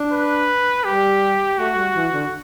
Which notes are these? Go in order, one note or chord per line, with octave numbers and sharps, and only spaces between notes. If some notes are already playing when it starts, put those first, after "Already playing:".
Already playing: D4
B4
G3 G4
A3 F#4
G3
E3
D3